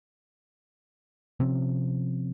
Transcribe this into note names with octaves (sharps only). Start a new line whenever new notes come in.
C3 F3 C4 C#4